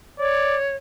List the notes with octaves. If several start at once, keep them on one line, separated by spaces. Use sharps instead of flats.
C#5 D5